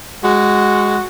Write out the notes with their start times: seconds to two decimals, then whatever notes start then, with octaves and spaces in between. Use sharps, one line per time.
0.24 G#3 F#4